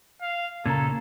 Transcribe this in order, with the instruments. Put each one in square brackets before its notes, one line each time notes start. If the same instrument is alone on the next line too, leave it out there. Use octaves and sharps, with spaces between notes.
[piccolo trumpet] F5
[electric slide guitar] A#2 C#3 A#3 [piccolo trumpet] A4 [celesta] A#5 G#6